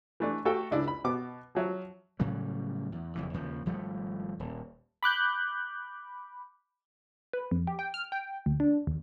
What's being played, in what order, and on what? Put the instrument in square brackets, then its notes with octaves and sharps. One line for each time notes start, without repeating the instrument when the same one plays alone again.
[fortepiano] E3 A3 D4
A3 F#4 A4 F5 G5 A5
C#2 D4 E4
B5
B2 B3 D6
F3 F#3 E5
[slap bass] A2 C#3 F#3 G3
E2
F#1 F2 E3
D#2 C#3 F3
G#1 F3 G3 A3
D#1
[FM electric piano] B5 D6 F#6 G6
[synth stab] B4
F2
G4
G5
F6
G5
D2
D4
D#2